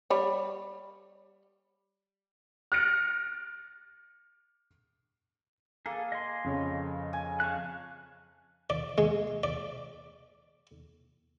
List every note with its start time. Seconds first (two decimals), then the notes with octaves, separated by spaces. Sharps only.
0.10 G3 C#5
2.72 F6 F#6 A6 A#6 C#7 D7
5.86 A#3 G#4 A4
6.12 D#5 G#5 C6
6.44 F2 C#3 C#5
7.13 G#5
7.40 F5 A5 C#6 F#6
8.70 D5
8.98 G#3
9.43 D5